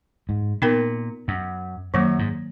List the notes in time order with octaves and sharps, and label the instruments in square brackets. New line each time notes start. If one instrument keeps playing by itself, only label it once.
[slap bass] G#2
[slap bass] A#2 [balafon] B3 D#4 A#4
[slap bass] F#2
[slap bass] F#2 [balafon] D#3 F#3 A#3
[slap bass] G#2